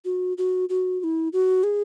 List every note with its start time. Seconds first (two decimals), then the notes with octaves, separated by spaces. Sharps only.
0.05 F#4
0.38 F#4
0.69 F#4
1.00 F#4
1.04 E4
1.33 F#4
1.64 G#4